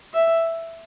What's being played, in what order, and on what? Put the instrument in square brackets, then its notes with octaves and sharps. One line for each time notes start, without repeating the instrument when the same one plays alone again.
[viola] E5